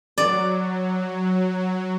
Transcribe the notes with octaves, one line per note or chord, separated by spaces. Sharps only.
F#3 D5